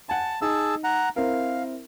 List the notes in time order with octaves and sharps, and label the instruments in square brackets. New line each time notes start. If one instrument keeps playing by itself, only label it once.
[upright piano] F#5 G#5 [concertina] A5
[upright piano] D#4 [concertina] G#4 A5 E6
[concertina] F#5 A#5
[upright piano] C4 E4 A#4 [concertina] F5